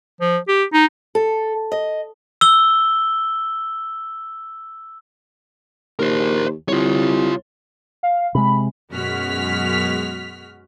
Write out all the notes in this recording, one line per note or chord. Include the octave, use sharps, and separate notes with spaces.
F3
G4
D#4
A4
D#5
E6 G7
D#2 A#4 C5
C2 F4 C#5
F5
C3 G#3 B5
F#2 B2 G#3 F#4 F6 B6